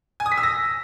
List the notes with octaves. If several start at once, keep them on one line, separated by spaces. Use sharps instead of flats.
G#5
D#6
B6
E6
A#6